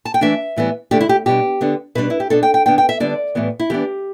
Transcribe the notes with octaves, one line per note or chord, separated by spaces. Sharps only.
A5
G5
E3 A3 D4 E5
A2 E3 G3 B3
D3 A3 D4 G4
E4
G4
B2 G3 D4 G4
D3 B3 D4
B2 G3 D4 B4
E4
G4
B2 B3 D4 A4
G5
G5
D3 B3 D4 G5
G5
E5
D3 G3 B3 D4 D5
A2 E3 G3 B3
E4
E3 B3 D4 G4